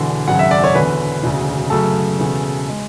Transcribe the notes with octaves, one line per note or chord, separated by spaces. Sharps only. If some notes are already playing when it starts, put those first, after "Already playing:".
Already playing: E1 E2 D3
G#1 F#2 C#3 F#5
E5
D5
C#5
E1 E2 D3 B4
E1 D2 C#3
F#2 C#3 F#3 A3 A4
E1 E2 C#3
G#3